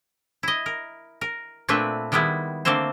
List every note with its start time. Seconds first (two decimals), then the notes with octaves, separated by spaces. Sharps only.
0.43 E4 D#5
0.66 A#4
1.21 A#4
1.69 A#2 A3 C4 D4 B4 E5
2.12 D#3 G3 G#3 B3 E4
2.65 D3 A3 A#3 C4 C5